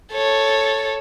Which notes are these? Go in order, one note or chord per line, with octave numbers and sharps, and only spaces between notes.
A4 C#5